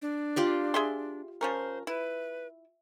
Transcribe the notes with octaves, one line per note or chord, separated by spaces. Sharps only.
D4
F4 G4 D5
G#4 E5 C6
F3 C#4 A#4 C5
E4 B4